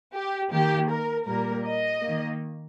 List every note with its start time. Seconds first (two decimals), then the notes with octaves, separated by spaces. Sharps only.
0.12 G4
0.50 D#3 A#3 G4
0.89 A#4
1.26 A#2 G3 A#3 A#4
1.65 D#5
2.03 D#3 A#3